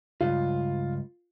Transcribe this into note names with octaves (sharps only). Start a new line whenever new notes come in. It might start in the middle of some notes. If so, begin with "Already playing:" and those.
C#2 G2 F4